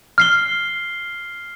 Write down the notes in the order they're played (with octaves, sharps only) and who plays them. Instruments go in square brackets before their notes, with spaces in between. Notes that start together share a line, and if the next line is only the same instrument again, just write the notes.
[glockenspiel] F6 C7 G7